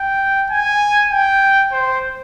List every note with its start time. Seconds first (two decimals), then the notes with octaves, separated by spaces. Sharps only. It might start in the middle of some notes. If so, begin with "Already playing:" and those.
Already playing: G5
0.50 G#5
1.11 G5
1.72 C5